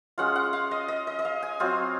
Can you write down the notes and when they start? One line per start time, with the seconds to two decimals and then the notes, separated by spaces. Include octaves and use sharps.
0.18 G#3 C#4 F4 F#5
0.36 F#5
0.53 F5
0.71 D#5
0.88 D#5
1.07 D#5
1.19 D#5
1.25 F5
1.42 G#5
1.60 F#3 C4 F4